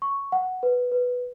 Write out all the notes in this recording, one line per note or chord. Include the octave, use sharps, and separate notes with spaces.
C#6
F#5
B4
B4